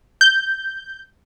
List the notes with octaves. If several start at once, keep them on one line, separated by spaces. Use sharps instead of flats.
G6